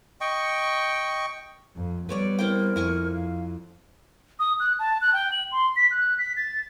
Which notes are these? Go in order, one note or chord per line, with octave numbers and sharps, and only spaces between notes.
D#5 G5 C#6
F2
G3 B3 B4 C#5 D5
C4 E4 A#4 G5
F2 E4 G#5 C#6
F5
D#6
F#6
A5
F#6
G5
F#7
C6
B6
F#6
B6
A6